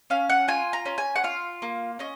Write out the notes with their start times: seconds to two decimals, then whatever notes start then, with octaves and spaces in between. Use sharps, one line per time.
0.10 C#4 F5
0.30 F#5
0.48 F4 G#5
0.73 A#5
0.86 C#4
0.98 G#5
1.16 F#5
1.24 F4 F5
1.62 A#3
1.99 C#4 D#5